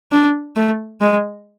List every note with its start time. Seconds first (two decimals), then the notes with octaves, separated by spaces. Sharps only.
0.12 D4
0.56 A3
1.01 G#3